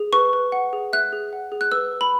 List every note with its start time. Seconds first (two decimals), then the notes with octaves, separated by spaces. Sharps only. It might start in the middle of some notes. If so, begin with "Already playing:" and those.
Already playing: G#4
0.13 B4 C#6
0.33 B4
0.52 F#5
0.73 G#4
0.93 E5 F#6
1.13 G#4
1.33 F#5
1.52 G#4
1.61 F#6
1.72 B4 E6
1.91 B4
2.01 B5